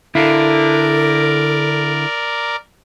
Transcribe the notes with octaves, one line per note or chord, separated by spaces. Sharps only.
D3 E4 A4 A#4 D5 F5 A5